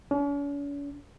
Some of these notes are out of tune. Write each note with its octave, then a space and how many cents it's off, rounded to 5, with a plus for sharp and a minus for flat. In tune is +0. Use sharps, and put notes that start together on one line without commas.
C#4 +45